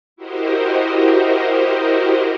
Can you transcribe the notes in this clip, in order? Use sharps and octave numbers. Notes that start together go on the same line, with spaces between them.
E4 F#4 G4 A#4 C5 D#5